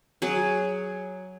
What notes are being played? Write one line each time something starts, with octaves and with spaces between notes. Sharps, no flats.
F#3 G#4